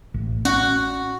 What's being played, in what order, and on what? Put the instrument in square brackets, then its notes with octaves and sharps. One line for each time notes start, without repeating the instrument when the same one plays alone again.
[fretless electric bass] A1
[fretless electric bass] C#4 [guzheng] F#4